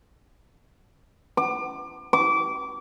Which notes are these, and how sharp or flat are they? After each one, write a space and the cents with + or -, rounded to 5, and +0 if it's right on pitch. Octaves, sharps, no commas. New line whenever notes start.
D6 +30
D6 -25